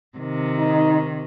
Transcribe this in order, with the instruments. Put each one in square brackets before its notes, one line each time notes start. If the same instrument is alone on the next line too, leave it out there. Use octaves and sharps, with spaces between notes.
[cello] C3 D#3
[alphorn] D#4